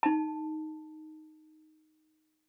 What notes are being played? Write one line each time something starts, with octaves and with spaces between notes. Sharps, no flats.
D#4 A5